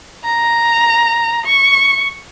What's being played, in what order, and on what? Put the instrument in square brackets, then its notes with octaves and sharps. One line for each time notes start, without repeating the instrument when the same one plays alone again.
[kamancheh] A#5
C#6